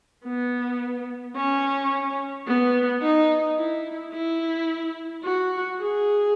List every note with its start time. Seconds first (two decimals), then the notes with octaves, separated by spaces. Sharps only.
0.25 B3
1.36 C#4
2.47 B3
3.02 D#4
3.57 E4
4.13 E4
5.24 F#4
5.80 G#4